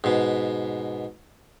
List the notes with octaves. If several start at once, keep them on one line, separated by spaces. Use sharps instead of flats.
G#2 B2